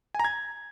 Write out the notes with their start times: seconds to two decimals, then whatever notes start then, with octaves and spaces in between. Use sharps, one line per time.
0.15 G#5
0.20 A#5
0.25 G#6